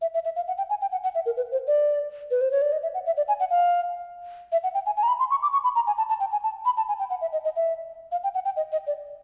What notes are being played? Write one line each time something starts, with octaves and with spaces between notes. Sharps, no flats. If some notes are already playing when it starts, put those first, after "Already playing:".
E5
E5
E5
F5
F#5
G5
G#5
G5
F#5
F#5
E5
A#4
B4
C5
D5
B4
C5
C#5
D5
D#5
E5
F#5
E5
D5
G#5
F#5
F5
E5
F#5
G5
G#5
G#5
A#5
B5
C6
C#6
D6
C#6
B5
A#5
G#5
A5
A5
G5
G#5
A5
B5
A5
G#5
G5
F#5
E5
D#5
D#5
E5
F5
G5
F#5
G5
D#5
D#5
D5